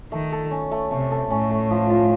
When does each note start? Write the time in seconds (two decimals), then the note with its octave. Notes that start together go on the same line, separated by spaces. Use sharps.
0.11 D#3 A3
0.32 A4
0.51 C#4
0.71 A3
0.91 C3 A3
1.11 A4
1.30 A2 C#4
1.51 A3
1.70 F3
1.90 F4